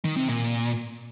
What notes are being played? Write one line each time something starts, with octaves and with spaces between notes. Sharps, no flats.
D#3
C3
A#2